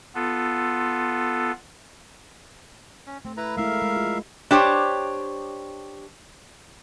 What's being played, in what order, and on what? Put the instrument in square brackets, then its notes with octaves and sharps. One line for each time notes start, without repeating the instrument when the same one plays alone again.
[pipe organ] B3 F4 A4
[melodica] C#4
[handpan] A3 [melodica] C4
[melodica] E4 B4 A#5
[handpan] G#3 A3 E4 [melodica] A#4 E5 F5
[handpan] G#3
F4
[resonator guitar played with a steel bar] D4 G4 C5 C#5